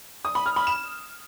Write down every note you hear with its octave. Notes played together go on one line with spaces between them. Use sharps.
D#6
B5
F6
B5
E7